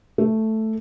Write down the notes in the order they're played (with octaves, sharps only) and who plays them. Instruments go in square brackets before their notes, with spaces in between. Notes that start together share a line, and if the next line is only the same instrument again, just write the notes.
[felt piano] A3